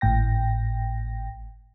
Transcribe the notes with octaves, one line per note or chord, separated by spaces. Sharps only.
G#1 A2 G5 A#6